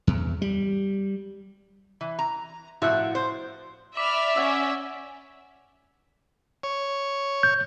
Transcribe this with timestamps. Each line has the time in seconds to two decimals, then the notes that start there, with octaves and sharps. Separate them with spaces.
0.07 E2
0.42 G3
2.01 E3
2.19 A#5
2.82 A2 F3 F#4 E5 F#6
3.15 C5
3.97 D5 E5 B5 D6 F6
4.36 C#4 C#5 F#5 E6
6.63 C#5
7.43 G6